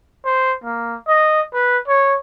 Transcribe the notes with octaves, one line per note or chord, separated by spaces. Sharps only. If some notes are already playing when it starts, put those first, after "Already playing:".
C5
A#3
D#5
B4
C#5